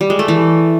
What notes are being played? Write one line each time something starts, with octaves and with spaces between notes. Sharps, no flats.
G3
G#3
A3
E3